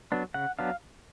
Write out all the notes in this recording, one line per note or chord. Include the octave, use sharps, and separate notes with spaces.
F#3 B3 D4
C#3 F#5
F#3 B3 D4 F5